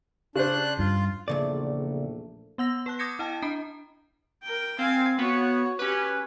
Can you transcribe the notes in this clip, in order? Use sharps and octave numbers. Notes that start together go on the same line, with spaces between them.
C#3 D4 C5 F#6
G2 F4
A#1 E2 A#2 C#3 A3 D5
B3 F#5 E6 A#6
B4 A5 F#6
D6 D#6 G6 G#6 A#6 C#7
E4 D#5 G5 A5
D4 A#5 B5 D7
A#4 G5
C4 F5 G#5
B3 F#4 C#5
C#4 G4 B4 G#5